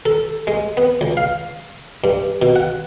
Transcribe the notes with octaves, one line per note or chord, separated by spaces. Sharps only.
A4
G#3
B3
C#2
F5
G2
B2
F#5